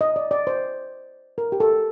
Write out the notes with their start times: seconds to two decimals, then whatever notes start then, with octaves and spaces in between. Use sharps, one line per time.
0.01 D#5
0.16 D5
0.31 D5
0.47 C5
1.38 A#4
1.52 G4
1.60 A4